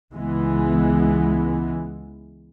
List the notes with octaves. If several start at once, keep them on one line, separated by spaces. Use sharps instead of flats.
C#2 E3 G#3 B3